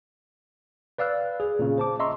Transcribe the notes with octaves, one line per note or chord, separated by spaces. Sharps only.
B4 D5 F5 E6 F#6
G#4
A#2 C#3
C5 A5 D6
D#5 E5 A#5 C6 C#6 E6